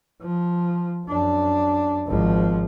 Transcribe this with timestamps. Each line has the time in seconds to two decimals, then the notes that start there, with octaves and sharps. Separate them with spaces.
0.21 F3
1.06 F#2 D4
2.08 G#1 F3